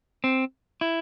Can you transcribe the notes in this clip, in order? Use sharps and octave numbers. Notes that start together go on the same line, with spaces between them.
C4
E4